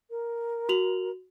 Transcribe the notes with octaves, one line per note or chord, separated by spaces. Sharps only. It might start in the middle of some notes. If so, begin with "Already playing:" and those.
A#4
F#4 F7 F#7